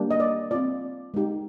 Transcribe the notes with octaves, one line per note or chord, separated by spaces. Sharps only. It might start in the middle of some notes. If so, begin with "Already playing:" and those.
Already playing: G3 A#3 D4 G4
D#5
D5
C4 F4 D5
G#3 D#4 G4